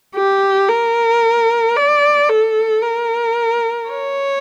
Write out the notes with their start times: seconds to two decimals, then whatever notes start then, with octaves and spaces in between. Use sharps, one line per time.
0.16 G4
0.69 A#4
1.76 D5
2.29 A4
2.82 A#4
3.89 C#5